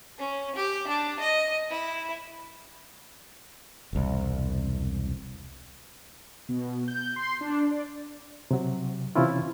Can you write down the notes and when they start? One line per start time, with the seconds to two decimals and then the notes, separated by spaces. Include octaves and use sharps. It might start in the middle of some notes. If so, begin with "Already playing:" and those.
0.18 C#4
0.56 G4
0.88 D4
1.20 D#5
1.70 E4
3.93 E1 C2
6.49 B2
6.88 G6
7.16 C6
7.41 D4
7.71 D5
8.51 C3 F#3
9.15 C3 E3 C#4 E4 F4